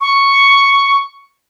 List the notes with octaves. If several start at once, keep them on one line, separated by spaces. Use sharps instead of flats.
C#6